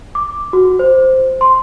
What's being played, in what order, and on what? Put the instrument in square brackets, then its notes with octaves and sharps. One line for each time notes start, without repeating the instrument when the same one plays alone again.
[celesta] D6
F#4
C5
C6